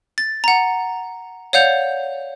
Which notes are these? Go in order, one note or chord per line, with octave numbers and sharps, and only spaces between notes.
A6
F#5 A#5
C#5 D5 F5 F#5 G6 F7